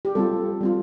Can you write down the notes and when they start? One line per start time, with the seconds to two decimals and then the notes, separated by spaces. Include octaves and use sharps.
0.05 G4
0.15 G3 C4 F4 A4
0.61 G3 C4 F4